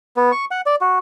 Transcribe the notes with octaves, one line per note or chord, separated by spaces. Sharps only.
B3
C#6
F#5
D5
F#4